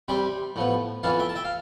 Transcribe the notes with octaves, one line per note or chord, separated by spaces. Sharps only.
C3 G3 C4 G5 B5
A2 F3 B3
F2 E3 B3 F5 A5
E5 G5
A5
E5 G5
F5